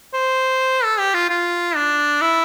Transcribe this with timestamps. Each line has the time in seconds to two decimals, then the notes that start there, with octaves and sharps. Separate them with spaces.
0.14 C5
0.84 A4
0.99 G4
1.14 F4
1.29 F4
1.76 D4
2.21 E4